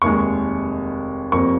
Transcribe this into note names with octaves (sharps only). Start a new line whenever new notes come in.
F1 D#2 D#3 G#3 C#6
F1 F2 F3 A#3 C#6